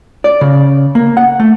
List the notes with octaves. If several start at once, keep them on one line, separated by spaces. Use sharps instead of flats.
D5
C#3
A#3
F#5
A3